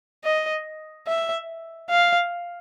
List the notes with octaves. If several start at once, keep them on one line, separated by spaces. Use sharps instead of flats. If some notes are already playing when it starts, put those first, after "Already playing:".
D#5
E5
F5